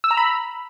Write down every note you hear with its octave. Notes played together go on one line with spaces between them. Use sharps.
E6
A#5
B5